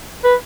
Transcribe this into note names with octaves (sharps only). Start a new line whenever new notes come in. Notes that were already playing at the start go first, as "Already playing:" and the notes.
B4